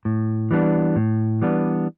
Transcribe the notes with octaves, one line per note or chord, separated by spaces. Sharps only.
A2
E3 G3 B3 D4
A2
E3 G3 B3 D4